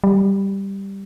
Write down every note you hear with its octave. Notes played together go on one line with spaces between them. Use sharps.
G3